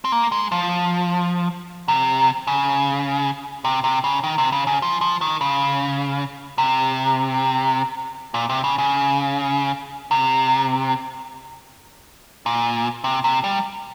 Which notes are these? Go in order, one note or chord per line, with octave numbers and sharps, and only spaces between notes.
C4
A#3
G#3
F3
C3
C#3
C3
C3
C#3
D#3
C3
C#3
C#3
F3
F3
D#3
C#3
C3
A#2
C3
C#3
C#3
C3
A#2
C3
C3
G3